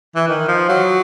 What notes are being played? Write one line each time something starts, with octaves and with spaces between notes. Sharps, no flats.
E3
D#3
F3
F#3